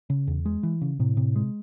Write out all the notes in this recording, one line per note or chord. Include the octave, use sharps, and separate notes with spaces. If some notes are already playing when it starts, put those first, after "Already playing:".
C#3
E2
G#3
E3
C#3
A2 C3
C3
G#3